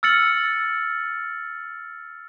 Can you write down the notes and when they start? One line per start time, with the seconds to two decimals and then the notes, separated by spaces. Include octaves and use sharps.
0.03 E6 F6 A6 C#7 F#7